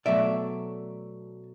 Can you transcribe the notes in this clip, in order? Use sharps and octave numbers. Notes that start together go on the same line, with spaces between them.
B2 F#3 A3 D5 E5